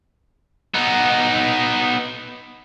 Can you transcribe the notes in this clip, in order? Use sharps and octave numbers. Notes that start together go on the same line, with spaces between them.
B3 D#4